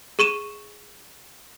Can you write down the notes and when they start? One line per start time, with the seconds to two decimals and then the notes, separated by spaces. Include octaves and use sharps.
0.19 G#4 C#6 D#7 E7